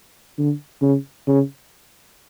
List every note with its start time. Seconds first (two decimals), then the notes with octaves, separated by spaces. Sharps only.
0.38 D3
0.82 C#3
1.27 C#3